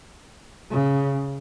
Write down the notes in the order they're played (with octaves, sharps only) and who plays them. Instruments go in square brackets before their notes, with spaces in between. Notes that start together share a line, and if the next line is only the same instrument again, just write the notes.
[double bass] C#3